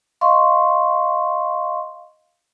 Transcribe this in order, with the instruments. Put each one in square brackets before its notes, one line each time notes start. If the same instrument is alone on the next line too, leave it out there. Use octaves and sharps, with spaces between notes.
[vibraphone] D#5 F5 C6 C#6